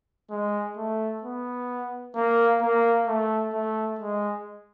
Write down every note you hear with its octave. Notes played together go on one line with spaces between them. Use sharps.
G#3
A3
B3
A#3
A#3
A3
A3
G#3